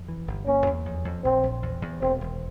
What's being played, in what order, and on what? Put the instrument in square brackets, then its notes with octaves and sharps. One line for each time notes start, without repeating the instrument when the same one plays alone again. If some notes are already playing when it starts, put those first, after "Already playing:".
Already playing: [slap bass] F2
E3
G1
[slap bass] A#3 [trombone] C#4
[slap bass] E2
F2
F2
[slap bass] A#1 [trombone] C4
[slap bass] A#1
E2
E2
[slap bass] E1 [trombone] C4
[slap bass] E1